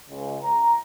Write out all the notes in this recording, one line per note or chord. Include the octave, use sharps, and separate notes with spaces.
C#2
A#5